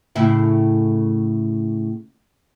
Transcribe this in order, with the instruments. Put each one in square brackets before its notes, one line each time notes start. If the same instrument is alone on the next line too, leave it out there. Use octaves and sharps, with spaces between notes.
[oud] A2 C#3 E4